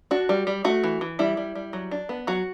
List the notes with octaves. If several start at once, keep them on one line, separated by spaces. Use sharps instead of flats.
D4 F#4
G3
G3
A3 F#4
E3
E3
G3 E4
G3
G3
F#3
D4
B3
F#3 F#4